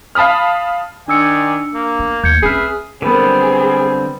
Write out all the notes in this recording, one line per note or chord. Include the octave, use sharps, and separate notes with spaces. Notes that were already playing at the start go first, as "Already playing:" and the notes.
F5 A5 B5 D#6 F6
D#3 D4 D5 G#5 E6 C#7
A#3
B3
D#2 G6 G#6 C#7
C4 C#4 G#4 B4 E5 F6 C7
D3 G3 B3 C4 G#4 B4